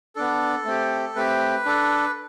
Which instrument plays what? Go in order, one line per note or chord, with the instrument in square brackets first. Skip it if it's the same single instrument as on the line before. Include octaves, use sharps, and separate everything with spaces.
[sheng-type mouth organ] B3 D4 A4
A3 C4 G4
A3 C4 G4 B4
D4 A4